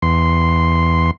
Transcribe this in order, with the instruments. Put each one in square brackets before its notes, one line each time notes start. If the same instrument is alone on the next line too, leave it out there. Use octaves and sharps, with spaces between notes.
[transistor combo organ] E2 C6